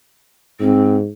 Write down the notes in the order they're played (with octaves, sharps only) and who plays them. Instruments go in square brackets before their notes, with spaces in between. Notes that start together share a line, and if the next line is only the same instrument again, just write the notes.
[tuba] G#2 [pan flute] C4